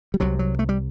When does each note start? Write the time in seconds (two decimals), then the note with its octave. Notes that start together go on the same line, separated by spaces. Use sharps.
0.14 G3
0.20 C2 C3 F#3
0.39 F#3
0.59 A3
0.69 G3